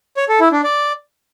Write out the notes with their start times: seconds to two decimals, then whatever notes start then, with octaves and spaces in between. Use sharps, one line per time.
0.17 C#5
0.29 A4
0.40 E4
0.52 D4
0.64 D5